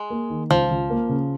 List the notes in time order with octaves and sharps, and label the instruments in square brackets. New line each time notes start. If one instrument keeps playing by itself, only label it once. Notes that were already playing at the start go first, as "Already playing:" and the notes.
Already playing: [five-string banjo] G#3
[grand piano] A#3
D#3
[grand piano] C#2 [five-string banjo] F3
[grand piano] C#2
A#3
C#3